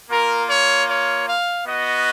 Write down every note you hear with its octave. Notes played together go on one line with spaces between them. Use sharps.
A#3 F4 A#4
C#5
C#5
F5
B3 F#4 D#5